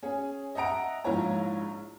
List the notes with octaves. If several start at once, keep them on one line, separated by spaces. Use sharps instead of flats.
C#4 G#4
D#5 E5 F#5 A#5 D7
A#1 G#2 E4 F4 C#5 A#5